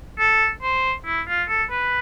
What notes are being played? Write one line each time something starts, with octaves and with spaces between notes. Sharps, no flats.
A4
C5
E4
F4
A4
B4